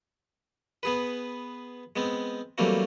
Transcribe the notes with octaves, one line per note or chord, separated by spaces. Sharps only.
B3 G#4 B4
G#3 B3 C4
E3 F#3 G3 A3 A#3 C4